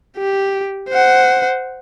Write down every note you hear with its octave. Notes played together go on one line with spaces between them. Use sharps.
G4
C5 F#5